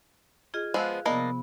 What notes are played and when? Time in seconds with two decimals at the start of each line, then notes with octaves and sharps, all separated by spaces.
0.54 F4 G#4 D#5
0.74 F3 G#3 B3 F5 E6 F#6
1.06 C3 F3 A#3 B3 D4 D#5